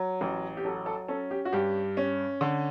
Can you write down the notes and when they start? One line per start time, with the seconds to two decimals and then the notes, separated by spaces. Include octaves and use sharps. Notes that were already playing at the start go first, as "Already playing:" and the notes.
Already playing: F#3
0.21 A1
0.57 G4
0.65 F#3 A4
0.86 A4
1.08 C#4 A4
1.31 G4
1.45 F#4
1.53 G2 G4
1.97 C#4
2.41 D3